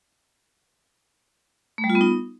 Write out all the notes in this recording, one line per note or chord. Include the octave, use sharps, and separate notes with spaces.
A3
G3
F4
B3
D#4